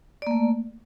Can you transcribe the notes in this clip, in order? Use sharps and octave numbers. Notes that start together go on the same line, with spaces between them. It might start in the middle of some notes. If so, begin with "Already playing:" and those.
A3 A#3 D5